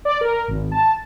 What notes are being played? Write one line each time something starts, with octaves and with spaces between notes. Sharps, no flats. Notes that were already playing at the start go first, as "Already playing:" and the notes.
D5
A#4
G#1
A5